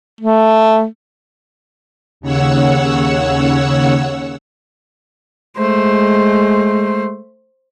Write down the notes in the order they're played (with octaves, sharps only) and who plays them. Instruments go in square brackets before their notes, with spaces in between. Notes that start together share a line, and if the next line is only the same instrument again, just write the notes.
[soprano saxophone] A3
[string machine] D#2 C#3 C#5 F#5 E6
[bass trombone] G#3 [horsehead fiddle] A3 C5